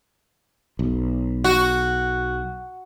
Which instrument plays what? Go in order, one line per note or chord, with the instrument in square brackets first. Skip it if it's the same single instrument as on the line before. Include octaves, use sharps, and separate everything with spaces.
[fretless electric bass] B1
[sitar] F#4